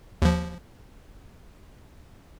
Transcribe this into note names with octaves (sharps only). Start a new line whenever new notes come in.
D#2 F3